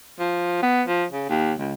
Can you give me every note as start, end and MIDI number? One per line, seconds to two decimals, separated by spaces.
0.19 0.58 53
0.62 0.82 59
0.88 1.04 53
1.12 1.26 49
1.29 1.53 39
1.59 1.74 37